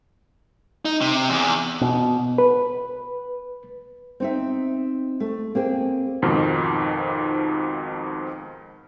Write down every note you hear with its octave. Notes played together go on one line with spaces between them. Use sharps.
D#4
C3
E2
B2
B4
C4 D#4 E5
A3
A#3 C4 G#4
F2 G#2 B2 D#3 F3